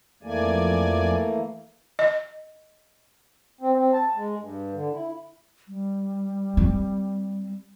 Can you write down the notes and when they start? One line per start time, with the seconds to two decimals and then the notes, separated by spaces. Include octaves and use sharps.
0.23 F2 E3 A3 A#3 D5 G#5
1.99 D#5
3.61 C4
3.77 C4
3.93 A5
4.15 G#3
4.39 G2
4.73 D3
4.93 E4
5.68 G3
6.57 C4